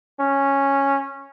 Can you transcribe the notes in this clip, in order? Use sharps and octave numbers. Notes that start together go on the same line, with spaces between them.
C#4